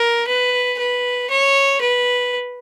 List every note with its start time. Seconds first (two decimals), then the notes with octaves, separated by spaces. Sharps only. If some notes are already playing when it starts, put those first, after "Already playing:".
Already playing: A#4
0.27 B4
0.79 B4
1.30 C#5
1.81 B4